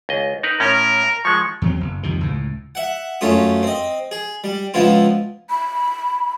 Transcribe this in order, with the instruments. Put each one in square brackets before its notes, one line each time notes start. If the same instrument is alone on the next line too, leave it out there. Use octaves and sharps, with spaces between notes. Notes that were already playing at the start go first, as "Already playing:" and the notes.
[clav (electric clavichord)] C#2 D#5
D#4 A#4 B4
[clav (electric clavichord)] A2 C#4 [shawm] A#4
[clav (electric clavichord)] F3 G#3 [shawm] C#6
[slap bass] E2 F#3 C4
F#1
C2 F2 C3 D#3
C#2 A2
[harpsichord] E5 F#5
F#2 A3 C#4 F4 D#6
C4 D#5
G#4
G3
C#2 F3 B3 E4 F4
[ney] B5